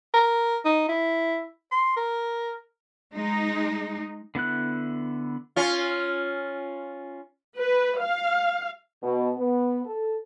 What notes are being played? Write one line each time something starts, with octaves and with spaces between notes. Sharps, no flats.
A#4
D#4
E4
C6
A#4
G#3 D#4
D3 B3 E4 F#6
C#4 F4
B4
F5
B2
B3
A4